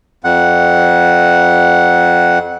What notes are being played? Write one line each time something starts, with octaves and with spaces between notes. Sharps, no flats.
F2 F#5